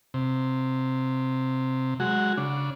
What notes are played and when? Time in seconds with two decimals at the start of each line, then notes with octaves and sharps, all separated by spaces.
0.14 C3
2.00 F#3 G#3 F#4
2.37 C#3 D4